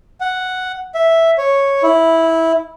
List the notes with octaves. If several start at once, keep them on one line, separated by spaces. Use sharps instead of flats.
F#5
E5
C#5
E4